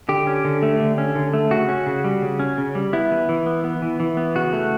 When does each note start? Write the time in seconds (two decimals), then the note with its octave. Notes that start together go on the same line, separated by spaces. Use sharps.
0.09 D3 G4
0.27 C#4
0.45 D3
0.62 A3
0.80 D3
0.98 C#4
1.16 D3
1.33 A3
1.51 C#3 F#4
1.68 C#4
1.87 C#3
2.04 G3
2.22 C#3
2.40 C#4
2.58 C#3
2.75 G3
2.93 B3 E4
3.11 E3
3.29 E3
3.46 B3
3.64 B3
3.82 E3
4.00 E3
4.17 B3
4.35 C#3 F#4
4.53 A3